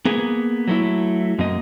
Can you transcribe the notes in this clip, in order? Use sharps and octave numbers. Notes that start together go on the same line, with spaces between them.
A#3 B3 G#4
F#3 A3 E4
F#2 A#3 D#5